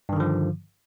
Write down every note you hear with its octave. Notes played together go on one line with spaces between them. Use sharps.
G2 D3 D#3 F3